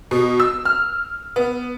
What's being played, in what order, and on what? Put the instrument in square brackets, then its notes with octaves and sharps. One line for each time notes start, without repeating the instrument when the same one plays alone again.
[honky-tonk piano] B2
E6
F6
B3